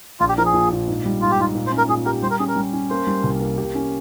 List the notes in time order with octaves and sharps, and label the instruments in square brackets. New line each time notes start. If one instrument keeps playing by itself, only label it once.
[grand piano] A#1 [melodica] F4
[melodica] G4
[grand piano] F3 [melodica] A#4
[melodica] G#4
[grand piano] A#2
A#2
G#2
G3
[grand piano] G#2 [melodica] F4
[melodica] G4
[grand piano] G#2 [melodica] F4
[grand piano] A#2
[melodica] C5
[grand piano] C#4
[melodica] A#4
[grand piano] A#2 [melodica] G#4
[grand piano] G4 [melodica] A#4
[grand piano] G3 [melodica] C5
[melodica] A#4
[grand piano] C#4 [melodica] G#4
[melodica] A#4
[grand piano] G3
C#4
[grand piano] A#3 [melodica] C5
[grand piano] G3
C2
A#3
G4
C#4